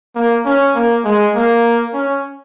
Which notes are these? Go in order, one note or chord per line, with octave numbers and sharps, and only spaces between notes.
A#3
C#4
A#3
G#3
A#3
C#4